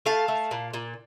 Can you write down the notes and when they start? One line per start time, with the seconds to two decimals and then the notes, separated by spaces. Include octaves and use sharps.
0.06 A3 F5 A5
0.28 A3
0.51 A#2
0.74 A#2